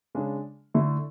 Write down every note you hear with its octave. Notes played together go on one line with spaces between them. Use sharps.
C#3 G#3 D4
D3 A3 E4